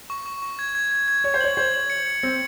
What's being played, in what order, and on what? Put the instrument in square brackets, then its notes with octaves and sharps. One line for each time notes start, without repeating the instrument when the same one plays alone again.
[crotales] C#6
C#6
C#6
G#6
G#6
G#6
G#6
[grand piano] C#5 [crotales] G#6
[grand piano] C5
[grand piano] C#5 [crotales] F#7
[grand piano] C5 [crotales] G#6
[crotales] F#7
C#7
C#7
[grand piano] C4 [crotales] C#7